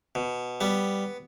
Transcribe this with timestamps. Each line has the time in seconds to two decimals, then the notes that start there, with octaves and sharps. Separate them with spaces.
0.15 B2
0.61 G3 B3